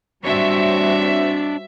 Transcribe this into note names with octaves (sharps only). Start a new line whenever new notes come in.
G3 C4 D4 F#4 C#5 E5